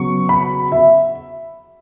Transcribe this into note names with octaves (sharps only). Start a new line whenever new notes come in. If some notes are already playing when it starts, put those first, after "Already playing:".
Already playing: C#3 F#3 B3 C#6
B5
E5